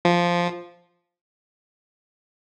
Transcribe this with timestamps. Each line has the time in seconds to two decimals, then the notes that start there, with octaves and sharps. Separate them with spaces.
0.05 F3